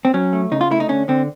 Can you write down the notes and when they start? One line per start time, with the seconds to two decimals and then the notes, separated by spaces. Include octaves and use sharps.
0.05 C4
0.14 F#3 C#4
0.33 A3
0.52 C#3 D#4
0.61 F4
0.71 A3 E4
0.80 D#4
0.89 D3 C#4
1.08 D3 C4